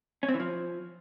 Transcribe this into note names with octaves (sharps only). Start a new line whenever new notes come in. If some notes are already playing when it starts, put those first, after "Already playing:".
C#4
C4
E3
F3